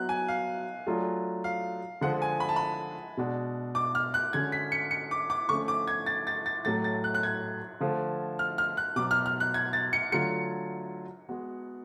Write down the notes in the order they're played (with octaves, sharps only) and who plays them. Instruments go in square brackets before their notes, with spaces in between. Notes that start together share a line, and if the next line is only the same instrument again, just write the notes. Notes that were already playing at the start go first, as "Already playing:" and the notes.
Already playing: [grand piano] F#3 B3 F#4 [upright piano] F#6
[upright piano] G#5
F5
[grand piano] F#3 A3 D4 F4 G#4
[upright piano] F5
[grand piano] D3 F3 G#3 [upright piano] F#5
[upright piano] G#5
B5
A5
B5
[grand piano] B2 G#3 D4 F#4
[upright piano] D6
F6
F#6
[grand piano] D3 G#3 C#4 F#4 [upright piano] G#6
[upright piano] B6
C#7
C#7
D6
D6
[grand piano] D3 F3 A3 C#4 [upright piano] C#6
[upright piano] D6
G#6
A6
A6
A6
[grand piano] A2 F#3 A3 [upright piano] A6
[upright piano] A6
F#6
F#6
G#6
[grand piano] D3 F3 A3
[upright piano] F6
F6
F#6
[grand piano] B2 F#3 B3 [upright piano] D6
[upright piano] F6
F6
F#6
G#6
A6
C#7
[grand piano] D3 F#3 A3 F4 [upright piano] C#7
[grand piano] G#3 B3 F#4